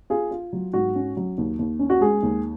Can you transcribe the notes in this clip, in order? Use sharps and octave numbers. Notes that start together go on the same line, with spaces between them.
F4 G#4
F4
F#3
G#2 F#4
C#4
F#3
D#2
D#2
C#4
F#4
G#3 G#4
D#2